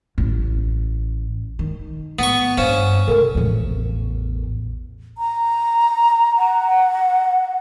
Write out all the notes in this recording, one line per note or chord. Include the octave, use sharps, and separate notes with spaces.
A1
D#3
A2 B3 C#6
G2 C#4 C5 F5 E7
C3 A3 A4 A#4
A1 E2
A#5
F#5